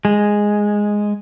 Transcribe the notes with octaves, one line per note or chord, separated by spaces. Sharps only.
G#3